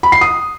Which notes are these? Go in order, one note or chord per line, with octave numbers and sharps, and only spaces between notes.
B5
C7
D#6